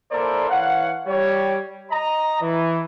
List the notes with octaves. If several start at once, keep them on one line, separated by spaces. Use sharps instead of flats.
A#3 E4 A4 A#4 C5 D5
E3 C#5 F5 F#5
G3 C#5
D#5 A#5
E3